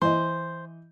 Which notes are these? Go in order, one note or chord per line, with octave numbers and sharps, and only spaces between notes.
E3 C5 D#5